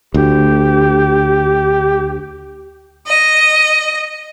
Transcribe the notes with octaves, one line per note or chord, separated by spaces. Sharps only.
D2 G4
D#5